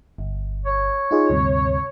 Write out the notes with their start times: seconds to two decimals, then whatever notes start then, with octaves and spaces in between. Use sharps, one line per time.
0.18 G1
0.65 C#5
1.11 D#4 F4 G#4
1.29 D2 G2 C3